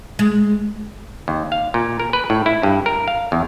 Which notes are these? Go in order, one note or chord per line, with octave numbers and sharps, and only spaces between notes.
G#3
D#2
F5
A#2
A#4
B4
A2
E4
G2
A#4
F5
E2